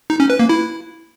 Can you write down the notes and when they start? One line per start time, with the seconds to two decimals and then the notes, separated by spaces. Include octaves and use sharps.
0.10 D#4
0.20 C#4
0.30 B4
0.40 A#3
0.49 E4